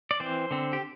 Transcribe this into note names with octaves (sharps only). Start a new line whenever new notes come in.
D5
E3 C4 C5
D3 C4
G4